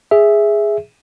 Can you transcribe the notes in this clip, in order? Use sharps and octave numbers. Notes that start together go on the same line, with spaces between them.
G#4 E5